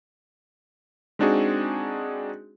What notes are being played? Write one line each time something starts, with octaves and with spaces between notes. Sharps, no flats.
G#3 C4 D4 D#4 F#4 G#4